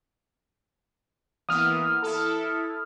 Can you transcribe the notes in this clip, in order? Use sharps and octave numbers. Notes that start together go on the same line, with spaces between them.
E3 A#3 B3 D#6 F6
E4 A4